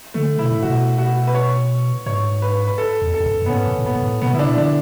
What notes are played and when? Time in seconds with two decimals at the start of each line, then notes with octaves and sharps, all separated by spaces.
0.14 D3 A3
0.38 B2 E4
0.52 A2
0.62 B2 F#4
0.98 F#4
1.27 B4
1.35 C#5
2.06 G#2 C#5
2.42 B4
2.67 B4
2.78 A4
3.02 E2
3.14 A4
3.20 E2
3.26 F#2
3.42 F#2
3.46 B3
3.50 G#2 C#4
3.67 A2
3.79 A2
3.85 G#2 B3
3.96 G#2
4.03 A2
4.22 B2 B3
4.33 C#3 E4
4.39 D4
4.44 B2
4.57 D3 D4